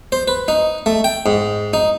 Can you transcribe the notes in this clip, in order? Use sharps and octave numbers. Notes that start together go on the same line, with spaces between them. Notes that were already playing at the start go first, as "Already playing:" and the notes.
C5
B4
D#4
A3
G5
G#2
D#4